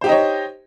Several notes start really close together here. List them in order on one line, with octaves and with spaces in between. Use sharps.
C5 G4 D#4 D#5 C#5